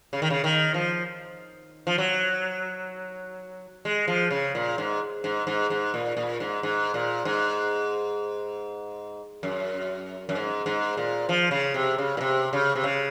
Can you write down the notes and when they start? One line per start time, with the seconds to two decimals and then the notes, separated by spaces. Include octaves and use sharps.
0.13 C#3
0.22 D#3
0.30 C#3
0.44 D#3
0.74 F3
1.87 F3
1.98 F#3
3.85 G#3
4.07 F3
4.31 C#3
4.55 A#2
4.78 G#2
5.24 G#2
5.47 G#2
5.70 G#2
5.94 A#2
6.17 A#2
6.40 G#2
6.63 G#2
6.94 A#2
7.25 G#2
9.43 F#2
10.29 F#2
10.35 G#2
10.66 G#2
10.97 A#2
11.29 F3
11.51 C#3
11.74 C3
11.98 C#3
12.17 A#2
12.21 C3
12.53 C#3
12.75 C3
12.84 C#3